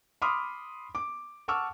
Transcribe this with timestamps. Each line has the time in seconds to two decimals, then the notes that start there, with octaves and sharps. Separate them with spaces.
0.22 B5 C6 D6 D#6 F6
0.95 D6
1.48 F#5 A5 C#6 D6 E6 F6